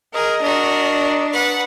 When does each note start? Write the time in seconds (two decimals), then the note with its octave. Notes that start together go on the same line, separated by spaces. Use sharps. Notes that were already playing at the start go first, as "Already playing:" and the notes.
0.14 G#4 A#4 D#5
0.43 D4 F#4 A#4
1.32 B4 F#5